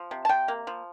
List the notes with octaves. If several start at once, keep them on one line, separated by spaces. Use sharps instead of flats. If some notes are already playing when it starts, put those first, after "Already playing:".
Already playing: F3
C3
A5
C3 G5
A#3
F3